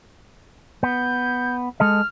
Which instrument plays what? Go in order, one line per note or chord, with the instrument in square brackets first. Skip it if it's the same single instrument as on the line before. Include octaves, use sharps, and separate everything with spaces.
[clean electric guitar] B3 [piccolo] G6
[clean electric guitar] G#3 A4 D#5 [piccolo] F6